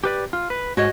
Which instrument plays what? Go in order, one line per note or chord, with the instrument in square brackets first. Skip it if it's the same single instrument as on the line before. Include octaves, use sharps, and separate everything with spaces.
[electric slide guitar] G4 B4 D5
F4
B4
[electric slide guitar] G#2 [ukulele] F#4 C#5 D#5